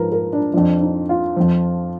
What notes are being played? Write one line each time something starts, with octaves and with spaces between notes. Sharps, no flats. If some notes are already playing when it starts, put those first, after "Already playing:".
Already playing: G#2 F3 A#4 B4
A#4
D4
F2 F3 D4
D#4
F4
F2 F3